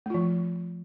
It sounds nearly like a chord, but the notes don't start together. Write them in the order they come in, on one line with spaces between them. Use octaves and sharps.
A3 F4 F3